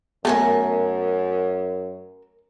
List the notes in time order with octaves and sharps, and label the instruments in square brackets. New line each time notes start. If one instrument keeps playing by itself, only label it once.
[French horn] F#2 [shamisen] A3 [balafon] B3 [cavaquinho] A#4 G#5 A5